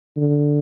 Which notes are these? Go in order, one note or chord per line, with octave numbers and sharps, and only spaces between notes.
D3